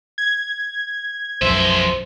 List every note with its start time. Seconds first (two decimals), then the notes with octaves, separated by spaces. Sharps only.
0.18 G#6
1.42 B1 F#2 F3 C5 E5